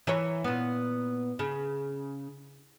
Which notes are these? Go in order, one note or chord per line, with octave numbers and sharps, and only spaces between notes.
E3 A#4 C#5
A#2 B3
C#3